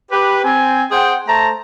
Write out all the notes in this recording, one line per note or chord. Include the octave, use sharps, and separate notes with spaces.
G4 B4
C4 G#5
G#4 C5 F#5 G5
A3 C5 A5 A#5